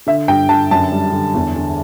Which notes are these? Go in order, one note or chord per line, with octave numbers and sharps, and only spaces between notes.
D3 E5
G2 G5
D3 A5
F#2 A5
G3
D3
E2
D3